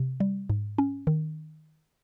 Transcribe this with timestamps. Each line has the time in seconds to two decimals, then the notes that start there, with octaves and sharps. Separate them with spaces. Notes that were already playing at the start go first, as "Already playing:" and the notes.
Already playing: C3
0.20 G3
0.50 G#2
0.78 C#4
1.07 D#3